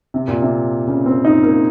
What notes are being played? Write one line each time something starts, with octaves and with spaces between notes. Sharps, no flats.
C3
A#2
C3
C#3
C4
D#4
A#3